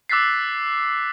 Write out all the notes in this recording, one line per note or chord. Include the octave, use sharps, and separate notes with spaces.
D6 E6 F#6 A6 B6 C7